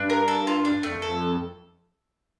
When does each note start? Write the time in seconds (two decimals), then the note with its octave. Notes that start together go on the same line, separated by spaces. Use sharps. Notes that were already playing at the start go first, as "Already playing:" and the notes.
Already playing: G2 D4
0.10 A#4
0.28 A4
0.47 F4
0.65 D4
0.83 F2 A3
1.02 F2 A4